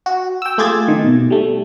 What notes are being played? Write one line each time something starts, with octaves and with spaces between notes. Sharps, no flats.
F#4
G5 E6
A3 F4 G4 G#4 G#6 A6
D#3
B2
G3 A3